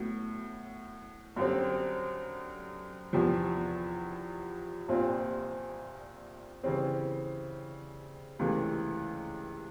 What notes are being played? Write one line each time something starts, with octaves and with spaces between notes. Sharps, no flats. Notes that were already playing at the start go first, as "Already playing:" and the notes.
Already playing: A2 F#3 B3
F#2 D3 G3 C4
E2 C3 F3
C2 A#2 G3 C4 F4
C#3 E3 G3 C4
C#2 C3 E3 A3